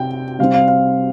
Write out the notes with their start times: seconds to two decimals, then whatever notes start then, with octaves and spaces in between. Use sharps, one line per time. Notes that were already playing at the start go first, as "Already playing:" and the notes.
Already playing: C3 G5
0.39 C3 G3 C4 F5
0.54 F5
0.68 F5